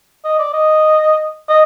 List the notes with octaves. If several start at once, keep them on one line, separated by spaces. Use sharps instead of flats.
D#5
D5
D#5
D#5